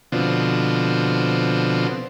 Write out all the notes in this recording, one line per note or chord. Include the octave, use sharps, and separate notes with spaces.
B2 D3 F3 C4